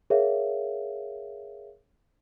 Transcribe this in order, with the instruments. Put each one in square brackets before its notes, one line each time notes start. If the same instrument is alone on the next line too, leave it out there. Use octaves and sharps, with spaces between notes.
[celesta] G#4 A#4 C#5 E5 F5